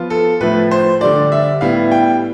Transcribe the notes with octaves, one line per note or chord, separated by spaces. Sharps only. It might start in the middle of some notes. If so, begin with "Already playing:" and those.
Already playing: F3 B3 F4
A4
A2 F3 A3 E4 B4
C5
D3 G3 D4 D5
E5
A2 G3 B3 E4 F5
G5